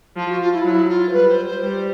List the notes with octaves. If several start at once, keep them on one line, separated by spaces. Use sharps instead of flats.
F3 F4
F#4
F4
E4
F#3 E4
F4
C5
G3 B4
C5
C5
G3 C5